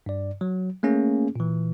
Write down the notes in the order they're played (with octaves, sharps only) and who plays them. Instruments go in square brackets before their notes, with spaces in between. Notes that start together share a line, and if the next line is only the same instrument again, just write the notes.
[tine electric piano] G2 D5
F#3
A3 A#3 C#4 G#4
A#2 E3